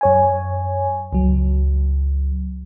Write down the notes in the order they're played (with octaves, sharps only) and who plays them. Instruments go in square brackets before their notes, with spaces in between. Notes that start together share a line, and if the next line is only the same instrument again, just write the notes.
[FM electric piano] F#2 C#5 G#5
C#2 F#3